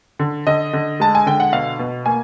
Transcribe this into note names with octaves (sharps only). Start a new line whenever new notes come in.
D3
D3 D#5
D3
G#3 A5
G#5
D3 G5
F#5
B2 F5
B2
A#3 G#5